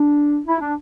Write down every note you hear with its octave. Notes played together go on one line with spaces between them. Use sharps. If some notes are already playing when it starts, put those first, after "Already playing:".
Already playing: D4
E4
D4